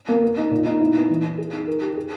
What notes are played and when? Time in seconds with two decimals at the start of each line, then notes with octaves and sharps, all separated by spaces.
0.08 A#3
0.23 A#4
0.37 D#4
0.51 A#2
0.65 D#4
0.81 E4
0.95 B3
1.10 E3
1.24 E4
1.38 G#4
1.53 D#4
1.67 A#4
1.81 G4
1.97 G#4